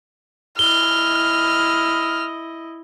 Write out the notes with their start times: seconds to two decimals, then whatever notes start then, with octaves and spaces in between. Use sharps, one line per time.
0.59 E4 D#5 F6 G7